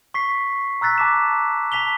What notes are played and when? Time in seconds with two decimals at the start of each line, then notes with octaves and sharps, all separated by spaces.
0.14 C#6 B6 C7
0.81 A#5 E6 F#6 A6 B6
0.98 A5 D6 E7
1.72 A5 B6 F7 G7